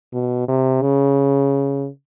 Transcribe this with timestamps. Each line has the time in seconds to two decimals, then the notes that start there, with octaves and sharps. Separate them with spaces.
0.13 B2
0.48 C3
0.82 C#3